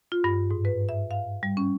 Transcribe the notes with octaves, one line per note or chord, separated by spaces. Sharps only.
F4
G2
G#2
B4
E5
F5
G3
C#4